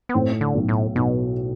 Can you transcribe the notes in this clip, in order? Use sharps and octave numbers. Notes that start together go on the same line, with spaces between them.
B3
A2 C4
D3
B1
A2
B1 B2